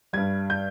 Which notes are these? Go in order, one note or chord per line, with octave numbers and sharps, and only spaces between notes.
G2 G3 G#6
G6